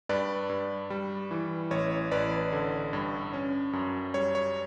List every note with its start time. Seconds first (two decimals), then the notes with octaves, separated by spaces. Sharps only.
0.09 G2 B4 D5
0.49 G2
0.90 G3
1.31 E3
1.71 A1 C#5
2.11 A1 B4 D5
2.53 D3
2.93 G2
3.33 C#4
3.73 F#2
4.14 G3 C#5
4.35 C#5